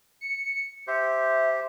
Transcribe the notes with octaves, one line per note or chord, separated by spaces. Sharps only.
C#7
G4 C5 E5